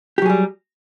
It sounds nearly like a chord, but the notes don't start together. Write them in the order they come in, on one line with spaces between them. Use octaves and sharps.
G4 F#3 G#4 G3